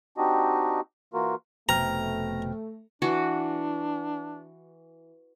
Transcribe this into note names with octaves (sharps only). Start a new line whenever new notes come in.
C4 D4 D#4 F#4 G4 D#5
E3 A#3 F4 F#4 A#4
F1 B2 A3 C5 G5 A#5 F6
E3 D4 F#4